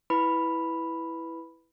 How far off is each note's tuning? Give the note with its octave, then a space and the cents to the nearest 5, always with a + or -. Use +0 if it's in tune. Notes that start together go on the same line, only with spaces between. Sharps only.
E4 +0 B4 +0 B5 +0